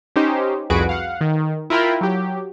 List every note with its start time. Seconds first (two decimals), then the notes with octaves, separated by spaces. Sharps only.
0.16 C#4 D#4 G4 C5
0.70 C2 F2 F#4 G#4 B4 D7
0.89 F5 F#5
1.21 D#3
1.70 E4 F4 A#4 G5 B5
2.01 F#3 G4